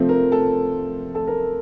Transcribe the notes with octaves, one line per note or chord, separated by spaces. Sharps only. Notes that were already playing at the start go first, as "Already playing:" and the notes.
Already playing: C3 F3 A3 C4
A#4
A4
A4
A#4